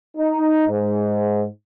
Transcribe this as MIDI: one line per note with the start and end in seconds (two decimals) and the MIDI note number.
0.17 0.68 63
0.68 1.44 44